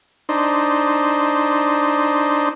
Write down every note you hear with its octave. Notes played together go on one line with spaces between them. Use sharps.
D4 D#4 C5